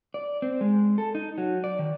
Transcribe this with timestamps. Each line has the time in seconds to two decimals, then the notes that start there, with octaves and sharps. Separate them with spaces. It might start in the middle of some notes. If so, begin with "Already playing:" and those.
0.14 D5
0.42 C4
0.61 G#3
0.98 A4
1.15 D#4
1.38 F#3
1.64 D5
1.79 D#3